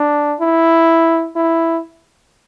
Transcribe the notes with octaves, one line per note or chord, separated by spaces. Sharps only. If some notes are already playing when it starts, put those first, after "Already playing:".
Already playing: D4
E4
E4